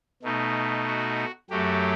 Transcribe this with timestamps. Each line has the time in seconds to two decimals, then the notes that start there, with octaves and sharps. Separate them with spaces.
0.23 B2 A3 D#4
0.87 F#4
1.50 F#2 F#3 A3 G4